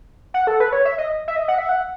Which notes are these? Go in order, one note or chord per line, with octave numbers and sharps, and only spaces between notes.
F#5
A4
B4
C#5
E5
D#5
E5
D#5
F#5
E5
F#5